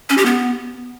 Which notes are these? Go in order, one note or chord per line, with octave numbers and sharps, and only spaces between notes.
C#4
G4
B3